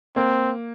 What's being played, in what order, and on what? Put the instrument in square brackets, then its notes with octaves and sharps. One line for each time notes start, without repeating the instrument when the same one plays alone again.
[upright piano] A#3 [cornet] C4